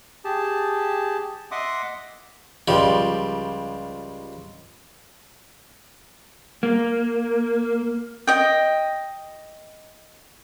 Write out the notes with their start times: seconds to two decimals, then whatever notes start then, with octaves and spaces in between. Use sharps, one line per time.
0.25 G4 G#4 A5
1.52 D#5 E5 F#5 C6 D6 D#6
2.68 C#2 F3 G3
6.63 A#3
8.27 D#5 G5